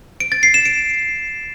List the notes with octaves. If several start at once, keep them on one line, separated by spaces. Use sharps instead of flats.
D7
A6
C7
E7
D7